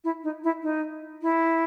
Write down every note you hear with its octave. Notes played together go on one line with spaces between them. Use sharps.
E4
D#4
E4
D#4
E4